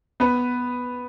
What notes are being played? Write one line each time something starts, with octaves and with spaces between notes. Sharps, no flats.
B3 B4